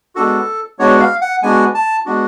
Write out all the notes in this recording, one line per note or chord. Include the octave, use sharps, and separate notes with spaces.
G#3 B3 D4 F#4 A4
G#3 B3 D4 F#4 C#5
F5
F#5
G#3 B3 D4 F#4 G#5
A5
G#3 B3 D4 F#4